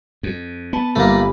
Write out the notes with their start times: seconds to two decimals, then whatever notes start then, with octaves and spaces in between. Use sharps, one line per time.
0.23 F2
0.73 B3 A5 B5
0.96 G1 A3 A#3 B5